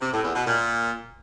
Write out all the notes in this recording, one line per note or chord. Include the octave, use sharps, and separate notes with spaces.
C3
A2
E2
B2
A#2